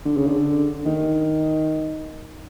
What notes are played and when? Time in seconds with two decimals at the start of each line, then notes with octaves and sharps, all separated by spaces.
0.05 D3
0.17 C#3
0.27 D3
0.85 D#3